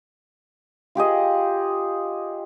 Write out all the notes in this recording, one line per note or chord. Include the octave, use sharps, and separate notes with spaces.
F4 G4 G#4 D#5